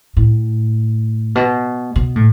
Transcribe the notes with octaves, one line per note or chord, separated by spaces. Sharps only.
A2
B2
B2
A2